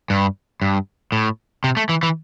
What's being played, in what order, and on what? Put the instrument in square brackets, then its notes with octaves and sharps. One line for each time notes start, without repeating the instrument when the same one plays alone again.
[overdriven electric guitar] G2
G2
A2
C3
A3
E3
E3